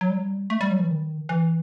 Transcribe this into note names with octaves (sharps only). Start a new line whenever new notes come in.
F#3
G3
A3
G3
F#3
E3
D#3
E3